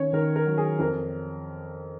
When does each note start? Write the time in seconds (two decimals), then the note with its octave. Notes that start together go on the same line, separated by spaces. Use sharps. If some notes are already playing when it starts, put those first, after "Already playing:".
Already playing: D#3 C#4 C#5
0.13 D#3 A#4
0.36 A#4
0.46 F#3
0.58 G#4
0.79 F2 A#4